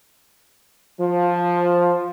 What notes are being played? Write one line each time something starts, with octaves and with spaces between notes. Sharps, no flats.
F3